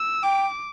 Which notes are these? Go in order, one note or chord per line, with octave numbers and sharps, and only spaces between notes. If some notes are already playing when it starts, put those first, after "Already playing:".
Already playing: E6
G5 D6